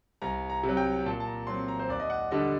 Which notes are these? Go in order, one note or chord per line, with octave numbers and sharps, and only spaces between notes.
C2 A#5
A#5
C3
F#3
G5
A#2 A5
A5
A#5
F#3 C4 C6
A#5
C5
D#2 D5
D#5
F#5
D3 G3 D4 D#5